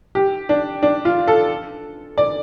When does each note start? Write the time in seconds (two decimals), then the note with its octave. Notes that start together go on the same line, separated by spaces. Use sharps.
0.15 G4
0.49 D4
0.83 D4
1.05 F4
1.28 A4
2.18 D5